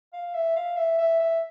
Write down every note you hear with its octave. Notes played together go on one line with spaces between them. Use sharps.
F5
E5
F5
E5
E5
E5